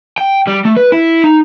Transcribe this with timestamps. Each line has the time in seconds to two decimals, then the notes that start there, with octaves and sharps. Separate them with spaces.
0.18 G5
0.47 G3
0.65 A3
0.77 B4
0.92 E4
1.24 D#4